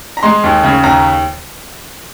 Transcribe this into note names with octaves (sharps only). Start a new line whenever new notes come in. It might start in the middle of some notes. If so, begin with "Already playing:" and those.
A#5
G#3 C6
D#2
C#3
D#2 A#5